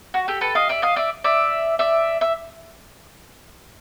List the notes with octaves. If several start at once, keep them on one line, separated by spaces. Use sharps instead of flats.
F#4
G4 A4
A4 B4
D#5 F5
D5 E5
D#5 F5
D5 E5
D5 E5
D5 E5
E5